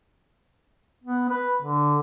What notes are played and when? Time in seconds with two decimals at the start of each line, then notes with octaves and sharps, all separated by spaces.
1.04 B3
1.29 B4
1.62 D3